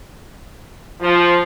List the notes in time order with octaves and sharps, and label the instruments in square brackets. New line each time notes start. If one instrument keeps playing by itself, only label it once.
[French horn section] F3